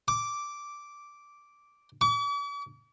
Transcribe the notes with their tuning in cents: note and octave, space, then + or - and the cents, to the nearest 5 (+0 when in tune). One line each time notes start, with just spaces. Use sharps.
D6 -5
D6 -45